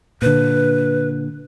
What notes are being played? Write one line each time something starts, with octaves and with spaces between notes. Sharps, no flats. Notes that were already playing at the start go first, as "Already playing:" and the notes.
A#2 D3 B4